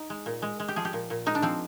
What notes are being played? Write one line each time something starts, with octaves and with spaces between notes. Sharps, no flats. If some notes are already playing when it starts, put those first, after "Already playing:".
Already playing: D#4
G#3
A#2
G#3
G#3
G4
F3 G#4
G4
A#2
A#2
G#3 D#4
D4
F3 C4